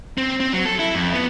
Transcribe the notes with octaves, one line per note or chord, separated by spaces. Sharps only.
C4
C4
F#3
A4
E4
F2
B3